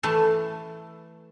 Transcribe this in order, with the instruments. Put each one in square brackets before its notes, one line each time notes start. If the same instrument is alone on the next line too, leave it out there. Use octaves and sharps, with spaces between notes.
[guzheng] E3 A3 A5